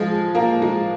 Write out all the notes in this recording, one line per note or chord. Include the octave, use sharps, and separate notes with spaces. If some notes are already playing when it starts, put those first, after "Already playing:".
Already playing: F3 G#3
A#3
G#3